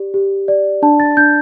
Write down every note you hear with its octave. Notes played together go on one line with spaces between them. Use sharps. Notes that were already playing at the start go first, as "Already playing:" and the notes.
Already playing: G4 D5
G4
D5
D4 A5
A6
D4 G6